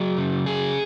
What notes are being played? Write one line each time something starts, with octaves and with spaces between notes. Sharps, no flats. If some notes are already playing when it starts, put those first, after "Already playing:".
Already playing: F#3 G#4
C#3
F#3 G#4